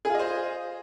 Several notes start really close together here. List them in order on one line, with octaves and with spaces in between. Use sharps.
G#4 F4 D#5 C5